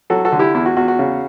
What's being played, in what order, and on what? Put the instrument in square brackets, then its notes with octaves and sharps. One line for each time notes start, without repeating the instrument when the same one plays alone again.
[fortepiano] F#3 F#4 A4
F#4 A4
D3
E4 G4
E2 E4
F#4
E2 F#4
F#4
C#3